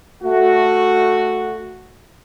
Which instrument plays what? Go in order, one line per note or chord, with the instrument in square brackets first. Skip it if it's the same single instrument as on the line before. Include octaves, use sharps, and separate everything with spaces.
[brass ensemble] A3 F#4